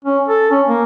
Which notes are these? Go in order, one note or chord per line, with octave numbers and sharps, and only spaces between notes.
C#4
A4
C#4
A#3